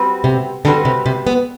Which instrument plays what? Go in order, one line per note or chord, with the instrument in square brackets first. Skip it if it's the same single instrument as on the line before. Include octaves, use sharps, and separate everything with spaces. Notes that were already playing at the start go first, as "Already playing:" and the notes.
Already playing: [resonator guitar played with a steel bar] G3 C4 F#4 B4
[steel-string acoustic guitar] C3
[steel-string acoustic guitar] D3 [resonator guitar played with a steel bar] G3 C4 F#4 B4
[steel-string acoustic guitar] C3
C3
B3